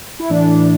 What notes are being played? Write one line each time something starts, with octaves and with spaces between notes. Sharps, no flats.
E4
A2 E3 D4